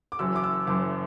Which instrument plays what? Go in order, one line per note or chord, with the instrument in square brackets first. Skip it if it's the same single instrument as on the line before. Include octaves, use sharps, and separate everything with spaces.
[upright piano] D6
F#1 F#2 E3 E6
D6
E6
F#1 F#2 E3 D6